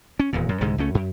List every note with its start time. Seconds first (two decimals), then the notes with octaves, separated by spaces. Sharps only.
0.20 C#4
0.33 D#1 E2 A#2
0.49 F#2
0.61 C2 G#2 D3 G#3
0.78 C#2 A3 C#4
0.95 F#2